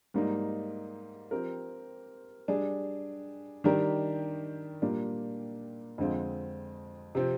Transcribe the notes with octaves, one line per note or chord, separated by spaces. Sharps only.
G#2 G3 A#3 D#4
F3 C4 G4 A#4
G3 D4 G#4
D#3 G3 D4 G4 A#4
A#2 G3 A#3 D4
F2 D3 G#3 C4 F4
C3 F3 C4